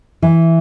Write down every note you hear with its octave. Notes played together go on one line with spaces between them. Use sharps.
E3